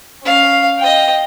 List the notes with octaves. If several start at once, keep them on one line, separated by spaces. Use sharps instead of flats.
C#4 F5
D#5 G5